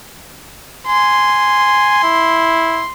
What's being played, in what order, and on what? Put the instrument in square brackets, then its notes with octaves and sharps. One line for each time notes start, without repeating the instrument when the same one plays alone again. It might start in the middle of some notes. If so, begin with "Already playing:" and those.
[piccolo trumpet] G#5 [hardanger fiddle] C6
[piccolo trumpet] E4